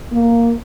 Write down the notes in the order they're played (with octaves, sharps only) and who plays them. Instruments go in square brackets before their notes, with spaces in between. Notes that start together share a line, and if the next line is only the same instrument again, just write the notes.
[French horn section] A#3